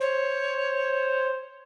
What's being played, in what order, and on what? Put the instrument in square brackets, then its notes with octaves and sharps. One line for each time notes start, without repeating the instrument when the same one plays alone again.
[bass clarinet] C5 [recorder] C#5